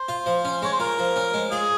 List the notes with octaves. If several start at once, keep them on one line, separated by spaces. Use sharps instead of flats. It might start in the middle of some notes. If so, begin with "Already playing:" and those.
Already playing: C5
F4
F3
C#4
G#3 C#5
C5
F4 A#4
F3
C#4
G#3
F4 G#4